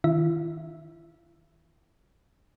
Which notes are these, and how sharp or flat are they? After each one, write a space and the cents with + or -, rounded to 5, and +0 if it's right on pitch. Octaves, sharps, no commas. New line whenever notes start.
D#3 +25 E4 +45 E5 +0